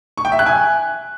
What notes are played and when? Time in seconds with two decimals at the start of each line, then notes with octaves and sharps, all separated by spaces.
0.18 C#6
0.25 G5
0.32 E5
0.39 F#6
0.46 G#5